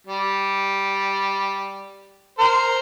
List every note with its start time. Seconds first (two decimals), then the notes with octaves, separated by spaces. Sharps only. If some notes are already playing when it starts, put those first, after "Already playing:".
0.07 G3
2.39 A#4 C5